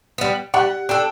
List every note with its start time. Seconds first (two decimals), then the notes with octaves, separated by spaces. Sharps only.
0.18 G3 B3
0.54 G3 F#5
0.89 D4 A4 G5